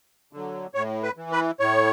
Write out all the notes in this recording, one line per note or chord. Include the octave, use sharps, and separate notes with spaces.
D3 F#3
A2 C#5
B4
E3
B4
A2 C#5